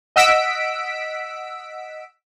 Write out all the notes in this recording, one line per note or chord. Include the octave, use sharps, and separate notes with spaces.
D#5 F#5 E6 B6 D7